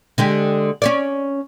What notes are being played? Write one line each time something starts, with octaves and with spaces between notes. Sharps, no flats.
D3 G#3 G4
C#4 C#5 D5